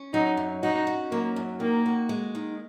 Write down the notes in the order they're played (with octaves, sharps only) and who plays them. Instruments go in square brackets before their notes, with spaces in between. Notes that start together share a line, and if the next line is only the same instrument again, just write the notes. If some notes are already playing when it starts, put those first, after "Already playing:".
Already playing: [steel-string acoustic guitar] C#4
[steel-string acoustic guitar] F#3 [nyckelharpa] D#4
[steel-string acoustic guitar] F#2
[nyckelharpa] D#4 [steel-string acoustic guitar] F#4
[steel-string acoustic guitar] C#4
[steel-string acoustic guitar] F#3 [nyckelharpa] A#3
[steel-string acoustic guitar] F#2
[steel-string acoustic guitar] D#3 [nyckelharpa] A#3
[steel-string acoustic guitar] F#4
G#3
D#3